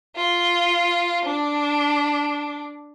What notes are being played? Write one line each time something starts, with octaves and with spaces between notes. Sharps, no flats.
F4
D4